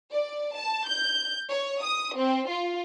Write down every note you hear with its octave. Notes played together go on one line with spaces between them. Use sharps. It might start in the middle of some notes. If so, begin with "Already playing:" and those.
D5
A5
G6
C#5
D#6
C4
F4